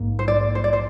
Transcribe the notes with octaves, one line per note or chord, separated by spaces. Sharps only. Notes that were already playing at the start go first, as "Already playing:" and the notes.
Already playing: A#1 G#2 A#3
C5
D5
C5
D5
C5